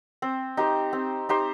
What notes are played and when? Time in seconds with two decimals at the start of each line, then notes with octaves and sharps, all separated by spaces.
0.22 C4
0.57 D#4 G4 C5
0.93 C4
1.29 D#4 G4 C5